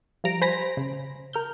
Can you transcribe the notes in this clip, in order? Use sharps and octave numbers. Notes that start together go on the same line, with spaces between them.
F3 G3 A#5 D7
C5 G#5 B5 A#6
C#3
A#4 F6 G6